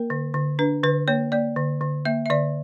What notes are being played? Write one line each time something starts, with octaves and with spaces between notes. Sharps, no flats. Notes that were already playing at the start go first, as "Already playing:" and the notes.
Already playing: A#3 A#4
D3
D3
D4 B4
D3 B4
A#3 C#5
A#3 D5
D3
D3
A#3 E5
E5
D3 D5